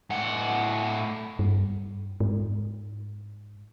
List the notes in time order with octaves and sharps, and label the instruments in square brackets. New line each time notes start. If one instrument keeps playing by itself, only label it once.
[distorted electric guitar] A2 F#5
[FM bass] G2
G#2